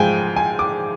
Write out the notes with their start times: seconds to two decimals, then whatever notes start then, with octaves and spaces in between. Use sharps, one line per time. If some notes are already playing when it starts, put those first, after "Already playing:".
Already playing: G#2 F3 G#3 G5 G#5
0.36 G#5
0.59 D6